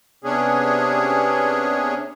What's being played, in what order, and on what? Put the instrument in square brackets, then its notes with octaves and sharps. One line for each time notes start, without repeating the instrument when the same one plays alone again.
[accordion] C3 B3 C#4 D4 G#4